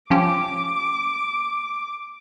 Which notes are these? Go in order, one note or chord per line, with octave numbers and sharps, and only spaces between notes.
F3 C#4 G4 D6